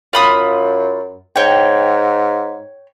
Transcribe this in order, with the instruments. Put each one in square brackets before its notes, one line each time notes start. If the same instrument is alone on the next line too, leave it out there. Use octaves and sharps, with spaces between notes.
[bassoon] F#2 [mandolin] F4 B5 D#6
[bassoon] G#2 [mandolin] C#5 G5